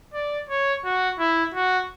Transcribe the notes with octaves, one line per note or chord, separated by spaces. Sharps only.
D5
C#5
F#4
E4
F#4